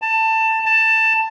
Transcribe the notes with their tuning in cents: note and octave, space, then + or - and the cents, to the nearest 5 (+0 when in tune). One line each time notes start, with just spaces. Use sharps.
A5 +20
A5 +15